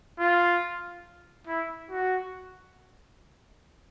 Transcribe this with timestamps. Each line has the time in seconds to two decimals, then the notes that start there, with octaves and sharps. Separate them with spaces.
0.19 F4
1.47 E4
1.90 F#4